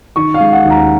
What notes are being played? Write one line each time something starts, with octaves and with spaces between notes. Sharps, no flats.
D#3 C#6
F5
G#3
F#5
D#2
A#5